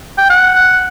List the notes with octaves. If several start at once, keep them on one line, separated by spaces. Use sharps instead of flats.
G5
F#5